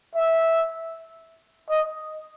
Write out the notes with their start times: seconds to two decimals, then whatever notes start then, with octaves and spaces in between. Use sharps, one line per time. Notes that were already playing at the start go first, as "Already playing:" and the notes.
0.15 E5
1.70 D#5